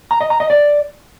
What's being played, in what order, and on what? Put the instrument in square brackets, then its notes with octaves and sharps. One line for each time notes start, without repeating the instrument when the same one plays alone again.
[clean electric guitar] A#5
D#5
A#5
D#5
D5